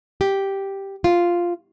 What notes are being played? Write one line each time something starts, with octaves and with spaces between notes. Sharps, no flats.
G4
F4